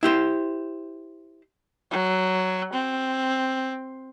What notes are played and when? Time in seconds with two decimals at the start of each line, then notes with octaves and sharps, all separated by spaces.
0.03 E4 G4 C5
1.91 F#3
2.73 C4